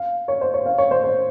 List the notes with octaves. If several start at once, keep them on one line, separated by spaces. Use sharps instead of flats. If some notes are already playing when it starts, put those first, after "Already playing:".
Already playing: F5
C#5
C5
C#5
F5
C#5
C5
C5